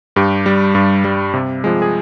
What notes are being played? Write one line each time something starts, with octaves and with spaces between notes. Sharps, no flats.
G2 G4
G3
G2
G3
C3
F3 G#3
G#4